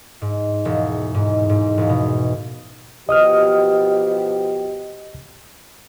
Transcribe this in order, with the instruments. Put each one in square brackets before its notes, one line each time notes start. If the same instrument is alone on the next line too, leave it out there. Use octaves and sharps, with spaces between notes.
[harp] G#2
E1
G#2
G#2
E1
B2
[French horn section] B2 F3 G4 [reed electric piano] D#5 D#6 F6